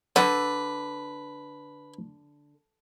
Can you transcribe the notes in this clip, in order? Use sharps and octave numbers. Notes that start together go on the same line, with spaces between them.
D3 B4